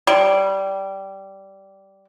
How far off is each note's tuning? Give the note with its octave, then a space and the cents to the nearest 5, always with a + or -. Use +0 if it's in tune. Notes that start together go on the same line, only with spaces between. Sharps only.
G3 -15